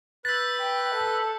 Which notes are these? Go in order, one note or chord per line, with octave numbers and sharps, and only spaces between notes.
B4 E6 F#6 G6 A6 B6
G5
A4